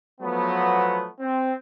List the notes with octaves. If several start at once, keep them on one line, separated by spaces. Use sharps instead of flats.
F3 F#3 A3 B3
C4